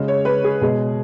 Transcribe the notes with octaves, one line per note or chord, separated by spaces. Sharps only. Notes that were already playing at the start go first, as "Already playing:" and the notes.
Already playing: C#3 G#3
C#5
B4
G#4
B2 G#3